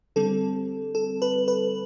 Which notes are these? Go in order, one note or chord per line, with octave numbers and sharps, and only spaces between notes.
D3 G3 C4 A4
A4
B4
B4